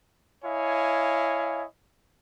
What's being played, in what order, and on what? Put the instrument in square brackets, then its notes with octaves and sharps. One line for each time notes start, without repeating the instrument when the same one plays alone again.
[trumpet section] E4 C#5 D#5 F5 G#5